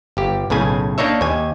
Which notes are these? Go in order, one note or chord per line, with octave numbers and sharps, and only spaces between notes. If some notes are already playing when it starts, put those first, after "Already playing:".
G1 G4
B1 A2 C#3 G#5
A#3 D4 D#4 C#5 E5
D#2 G#5